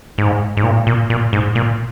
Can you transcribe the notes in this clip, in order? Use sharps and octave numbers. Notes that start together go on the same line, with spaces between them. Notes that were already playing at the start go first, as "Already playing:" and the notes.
G#2
G#2
A#2
A#2
A#2
G#2
A#2